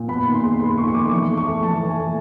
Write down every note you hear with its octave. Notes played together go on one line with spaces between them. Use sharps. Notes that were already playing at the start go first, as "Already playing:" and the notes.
Already playing: A#2
B3 B5
D#3
C6
G#3
B5
G#3 C6
D#3 C#6
C#6
B3 D6
E3 C#6
A3
C#6
A3
E3 A5
E3
G#5
A3